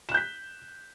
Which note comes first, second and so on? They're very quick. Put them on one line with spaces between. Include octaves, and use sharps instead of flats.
E7 F#6 G6 B6